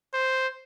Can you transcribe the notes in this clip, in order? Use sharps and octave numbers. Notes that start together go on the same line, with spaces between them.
C5